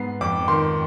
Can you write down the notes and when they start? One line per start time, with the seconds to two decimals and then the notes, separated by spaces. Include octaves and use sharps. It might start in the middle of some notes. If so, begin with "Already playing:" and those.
Already playing: G#2 B3 C7
0.21 F2 D6
0.48 D#3 C6